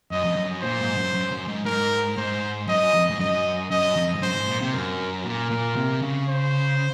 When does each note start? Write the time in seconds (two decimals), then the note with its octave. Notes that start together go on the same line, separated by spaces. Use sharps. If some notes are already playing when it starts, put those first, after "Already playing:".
0.11 F#2 D#5
0.25 F2
0.36 F#2
0.63 A#2 C5
0.80 G#2
0.97 F#2
1.14 F#2
1.32 F#2
1.48 G#2
1.65 G#2 A#4
2.17 G#2 C5
2.68 F#2 D#5
2.94 F2
3.11 G#2
3.19 F#2 D#5
3.71 F#2 D#5
3.96 F2
4.15 G#2
4.22 F#2 C5
4.36 G#2
4.48 A#2
4.61 C3
4.73 F#2 A#4
5.25 A#2 A#4
5.51 A#2
5.76 C3
6.02 C#3
6.29 C5